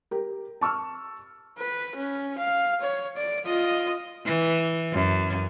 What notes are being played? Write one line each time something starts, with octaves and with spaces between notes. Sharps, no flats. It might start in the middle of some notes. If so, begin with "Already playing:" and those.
G4 A#4
A5 C#6 E6 F6
B4
C#4
F5
C#5
D5
F4 D#5
E3
F#2